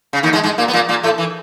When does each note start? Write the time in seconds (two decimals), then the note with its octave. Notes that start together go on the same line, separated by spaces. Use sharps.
0.13 C#3
0.23 D#2 D#3
0.33 G#2 G#3
0.44 G#2 G#3
0.58 A#2 A#3
0.68 B3
0.73 A#2 A#3
0.89 A#2 A#3
1.03 A2 A3
1.18 E3